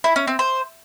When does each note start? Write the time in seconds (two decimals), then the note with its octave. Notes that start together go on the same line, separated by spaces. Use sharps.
0.04 E4
0.16 C#4
0.27 C4
0.39 C5